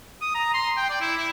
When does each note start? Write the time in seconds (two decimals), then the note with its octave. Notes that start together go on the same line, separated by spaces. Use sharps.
0.21 D#6
0.35 A#5
0.54 C6
0.77 G5
0.89 D5
1.01 E4
1.17 E4